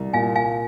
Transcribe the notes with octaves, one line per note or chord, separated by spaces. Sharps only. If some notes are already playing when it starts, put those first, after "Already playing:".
Already playing: C2
A#2 F5 G#5
F5 G#5